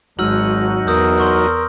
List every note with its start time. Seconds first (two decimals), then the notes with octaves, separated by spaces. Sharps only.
0.19 G#1 F#3 G#3 D#4 F#4 E6 F6 F#7
0.87 E2 A#4 D#6 E6 G6
1.18 C6 C#6 F6